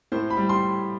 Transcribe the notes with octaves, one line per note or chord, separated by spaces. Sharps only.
A2 C5
B5
G3
C6